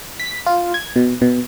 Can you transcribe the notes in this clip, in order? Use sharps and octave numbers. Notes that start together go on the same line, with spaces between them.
B6
F4
G#6
B2
B2